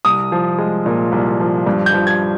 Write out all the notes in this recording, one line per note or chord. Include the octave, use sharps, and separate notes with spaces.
C2 D#6
F3
G#3
A#2
C2
F3
G2
G6
F3
G#6